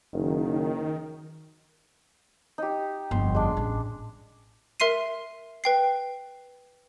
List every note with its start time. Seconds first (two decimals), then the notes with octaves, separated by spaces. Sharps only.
0.13 F#1 D#3
2.58 D#4 G4
3.11 G1 F2 C6
3.35 G#3 D4
3.57 A1
4.80 A#4 E5 C6 C7 D#7
5.64 B4 G5 C7